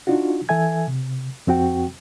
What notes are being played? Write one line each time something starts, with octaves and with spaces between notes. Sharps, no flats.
D4 D#4 F4 F#4
E3 A4 E5 G#5 G#6
C3
F2 C4 F#4 G5